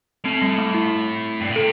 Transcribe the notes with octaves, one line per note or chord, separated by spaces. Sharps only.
A2 C4
G3
A3
E4
G2
A2
C3 A4